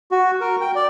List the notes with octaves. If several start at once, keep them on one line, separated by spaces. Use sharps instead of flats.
F#4
A#4
G5
D5